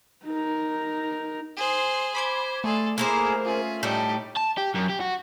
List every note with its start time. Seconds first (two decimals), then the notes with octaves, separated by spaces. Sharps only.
0.25 D#4 A#4
1.57 G#4 C5 C6
2.15 C5 B5 D6 G#6
2.64 A3 G#4 A4 D5 C6
2.98 A#3 E4 G#4 A#4 C5 B5 D6
3.45 C#4 F4 G#4 E5
3.83 A2 G3 D#4 E4 G4
4.36 A5
4.57 G4
4.74 F#2
4.89 G4
5.00 F#4